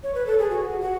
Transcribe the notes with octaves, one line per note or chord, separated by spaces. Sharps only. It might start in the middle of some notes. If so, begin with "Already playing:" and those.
C#5
B4
A4
G#4
F#4
F#4